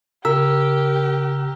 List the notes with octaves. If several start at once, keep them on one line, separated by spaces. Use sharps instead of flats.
C#3 G4 A#4 E6 B6